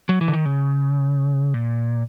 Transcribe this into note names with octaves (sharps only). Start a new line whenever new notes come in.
F#3
E3
D3
D#3
C#3
A#2